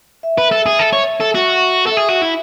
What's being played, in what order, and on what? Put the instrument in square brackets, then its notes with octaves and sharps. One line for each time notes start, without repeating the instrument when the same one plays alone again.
[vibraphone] E5
[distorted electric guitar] B4
A4
G#4
A4
C#5
A4
F#4
[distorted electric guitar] A4 [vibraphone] E5
[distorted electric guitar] G#4
F#4
E4